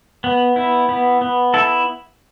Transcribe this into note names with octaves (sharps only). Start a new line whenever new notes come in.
B3
E4
B3
B3
E4 A4